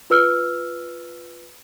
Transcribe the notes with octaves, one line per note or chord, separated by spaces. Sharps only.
F4 B4 E6 F6